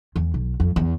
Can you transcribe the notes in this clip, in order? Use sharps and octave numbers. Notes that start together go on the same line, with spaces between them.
E2
B1
F2
E2